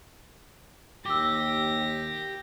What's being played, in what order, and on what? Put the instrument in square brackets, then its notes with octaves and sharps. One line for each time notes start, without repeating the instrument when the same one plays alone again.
[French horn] D#2 [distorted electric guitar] G4 [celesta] D6 E6 [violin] A#6